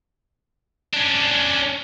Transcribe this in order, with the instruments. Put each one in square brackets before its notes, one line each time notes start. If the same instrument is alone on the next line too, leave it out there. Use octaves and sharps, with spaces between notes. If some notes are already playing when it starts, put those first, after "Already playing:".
[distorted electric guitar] C#4 D4